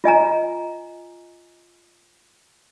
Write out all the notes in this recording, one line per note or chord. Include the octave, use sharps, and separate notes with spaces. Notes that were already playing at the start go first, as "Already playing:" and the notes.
F4 D#5 G#5 A#5